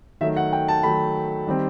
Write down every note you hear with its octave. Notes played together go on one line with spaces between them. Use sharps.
D#3 F#3 A3 E5
F#5
G5
A5
D#3 F#3 A3 B5
D#3 G3 C4